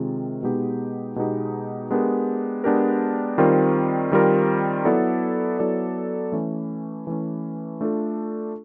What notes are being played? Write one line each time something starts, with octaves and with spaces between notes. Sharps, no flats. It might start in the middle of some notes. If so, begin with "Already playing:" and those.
Already playing: C3 D#3 G#3 C4 F4
B2 G#3 B3 D#4 G4
B2 G#3 B3 D#4 G4
G#3 B3 D4 G4 A#4
G#3 B3 D4 G4 A#4
D#3 G3 C4 F4 A#4
D#3 G3 C4 F4 A#4
F#3 B3 E4 A4 D5
F#3 B3 E4 A4 D5
E3 A3 C#4
E3 A3 C#4
A3 D4 F4 A4